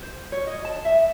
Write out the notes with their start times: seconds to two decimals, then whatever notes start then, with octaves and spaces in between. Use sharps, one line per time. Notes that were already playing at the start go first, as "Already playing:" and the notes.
0.02 C5
0.32 C#5
0.47 D#5
0.65 A5
0.85 E5